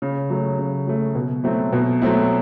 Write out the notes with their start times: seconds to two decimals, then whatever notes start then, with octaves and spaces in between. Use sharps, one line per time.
0.02 C#3
0.30 F#3 A3
0.59 C#3
0.87 F#3 A3
1.15 B2
1.44 F#3 A3 C4 E4
1.73 B2
2.02 F#3 A3 C4 E4